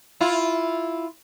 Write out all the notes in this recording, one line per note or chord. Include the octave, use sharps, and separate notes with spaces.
E4 F4